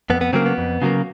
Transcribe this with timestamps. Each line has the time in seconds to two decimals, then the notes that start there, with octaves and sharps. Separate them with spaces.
0.10 F2 B3
0.21 B3
0.33 C#3 F#3 A#3 C4
0.46 B3
0.58 F2
0.82 C#3 F#3 A#3